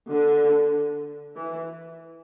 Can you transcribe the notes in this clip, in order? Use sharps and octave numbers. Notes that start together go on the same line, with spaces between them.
D3
E3